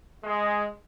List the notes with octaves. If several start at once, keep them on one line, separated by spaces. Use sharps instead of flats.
G#3